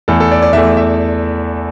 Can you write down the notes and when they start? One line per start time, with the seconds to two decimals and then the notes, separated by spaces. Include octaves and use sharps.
0.08 E2 E3 A3 A4
0.20 A4
0.32 D5
0.42 D5
0.53 E2 E3 A3 E5
0.77 E5